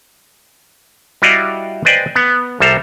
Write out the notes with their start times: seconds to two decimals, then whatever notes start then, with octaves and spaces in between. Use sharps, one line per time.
1.22 G3 E4 F#4 D5 D#5 F5
1.85 B4 C5 D5 D#5 G5 G#5
2.16 B3
2.60 C2 G3 A4 C5 A#5